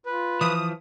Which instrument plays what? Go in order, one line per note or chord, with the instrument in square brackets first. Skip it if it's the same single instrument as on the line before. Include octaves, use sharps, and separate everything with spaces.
[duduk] F4 [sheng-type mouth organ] B4
[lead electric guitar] E3 F3 [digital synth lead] D#6